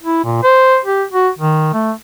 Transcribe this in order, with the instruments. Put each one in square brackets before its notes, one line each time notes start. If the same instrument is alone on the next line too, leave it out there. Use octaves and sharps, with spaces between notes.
[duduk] E4
A#2
C5
G4
F#4
D#3
A3